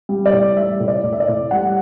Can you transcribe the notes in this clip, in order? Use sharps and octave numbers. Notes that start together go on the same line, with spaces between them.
G3
D5
A2
G3 E5
A2
D5
A2
E5
D5
A2
G3 F#5